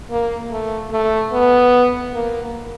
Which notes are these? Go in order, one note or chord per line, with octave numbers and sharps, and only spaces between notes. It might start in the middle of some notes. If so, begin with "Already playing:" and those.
A#3
A3
A3
B3
A#3